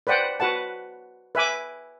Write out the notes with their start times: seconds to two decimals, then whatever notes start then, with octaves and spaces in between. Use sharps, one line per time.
0.07 B4 C5 D5 F#5 G5
0.40 F#4 B4 F#5 A5
1.35 B4 E5 G#5 D6